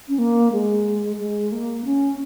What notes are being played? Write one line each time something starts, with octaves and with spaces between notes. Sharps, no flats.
C#4
A#3
G#3
G#3
A#3
C#4